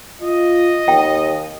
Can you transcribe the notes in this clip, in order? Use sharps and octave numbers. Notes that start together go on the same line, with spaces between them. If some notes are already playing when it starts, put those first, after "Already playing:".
F4 D#5
D#2 G5